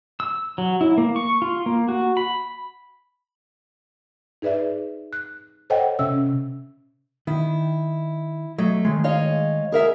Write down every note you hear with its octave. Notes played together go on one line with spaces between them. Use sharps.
E6
F#3
E4
A#3
C#6
F4
A#3
F#4
B5
D#4 G#4 B4 D5 E5
F#6
A4 C5 C#5 D#5 F#5 G5
C3 C#4 E5 E6
D#3 E4
F#3 A3 D#5
D#3 G#3
C#5 D#5 F5
G#4 A#4 E5